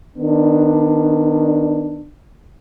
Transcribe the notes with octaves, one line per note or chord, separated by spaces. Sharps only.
D#3 B3 D4